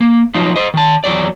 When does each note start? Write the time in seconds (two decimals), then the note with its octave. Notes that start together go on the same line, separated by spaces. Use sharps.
0.01 A#3
0.34 F3 F#3 D#4 F4
0.56 C5 D#5
0.74 D#3 A5
1.04 E2 F#3 D5